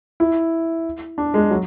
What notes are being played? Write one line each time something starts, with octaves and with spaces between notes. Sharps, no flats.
E4
D4
G#3
F#3